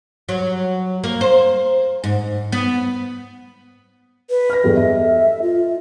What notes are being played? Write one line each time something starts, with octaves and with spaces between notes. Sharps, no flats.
F#3
A#3
C5
G#2
B3
B4
F6 A#6
E2 G2 G3 A4
A4 D#5 E5
F4